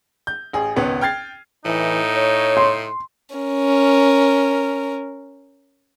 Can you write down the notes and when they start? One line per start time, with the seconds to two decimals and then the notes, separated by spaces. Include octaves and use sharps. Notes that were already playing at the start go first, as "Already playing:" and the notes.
0.27 G6
0.53 A1 G#4
0.76 G#1 C#2 B3 C#4
1.01 G5 F6 G#6 A6 C7
1.65 A2 E3 D#4
2.15 C#5
2.57 C6
3.36 C#4 A#4